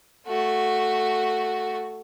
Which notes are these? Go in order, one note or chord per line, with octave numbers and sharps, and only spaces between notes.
A3 F#4